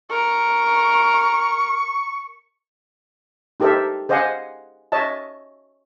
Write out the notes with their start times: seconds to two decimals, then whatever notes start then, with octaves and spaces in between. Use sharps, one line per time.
0.10 A#4 C#6
3.60 D#4 G4 A4 A#4 C5 E5
4.09 G#4 C5 D#5 F5 F#5 G#5
4.92 C#5 D#5 E5 A5